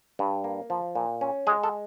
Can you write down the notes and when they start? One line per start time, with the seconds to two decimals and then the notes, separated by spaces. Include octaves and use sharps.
0.19 G2
0.44 A#3
0.70 F3
0.95 A#2
1.21 C#4
1.47 G#3 G#4
1.64 A4